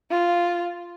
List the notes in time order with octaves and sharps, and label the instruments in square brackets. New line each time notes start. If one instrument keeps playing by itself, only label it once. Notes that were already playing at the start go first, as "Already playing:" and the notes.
[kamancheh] F4